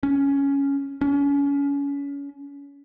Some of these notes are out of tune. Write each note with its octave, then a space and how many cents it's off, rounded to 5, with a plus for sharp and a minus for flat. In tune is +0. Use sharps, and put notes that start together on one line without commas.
C#4 +5
C#4 +30